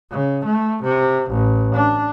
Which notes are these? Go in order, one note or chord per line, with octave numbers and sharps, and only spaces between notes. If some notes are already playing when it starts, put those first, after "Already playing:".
C#3
A3
C3
A1
D4